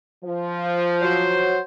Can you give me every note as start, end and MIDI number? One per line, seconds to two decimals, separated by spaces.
0.25 1.61 53
1.01 1.58 54
1.01 1.58 72